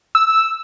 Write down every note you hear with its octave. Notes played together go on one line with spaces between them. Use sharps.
E6